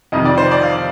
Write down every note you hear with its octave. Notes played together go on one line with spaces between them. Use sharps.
F2 C3 D#3 D#5
D5
C5
D5
F5